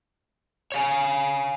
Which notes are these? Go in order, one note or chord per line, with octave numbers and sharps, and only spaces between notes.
C#5 F5 G#5